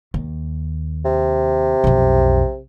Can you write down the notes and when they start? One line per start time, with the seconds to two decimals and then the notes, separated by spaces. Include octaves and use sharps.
0.14 D#2
1.05 C3
1.84 B1 F2